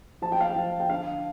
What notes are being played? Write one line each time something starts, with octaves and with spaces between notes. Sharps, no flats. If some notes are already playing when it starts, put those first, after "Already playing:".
F3 A5
G5
F5
G5
F3
G5
D3 F5